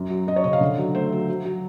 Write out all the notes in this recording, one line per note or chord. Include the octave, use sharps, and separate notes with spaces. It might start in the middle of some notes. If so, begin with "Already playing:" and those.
Already playing: F#2
F#3
F#2 D#5
C#5
C#3 D#5
F5
D3
F#3
A3 C5
F#3
F#3
F#3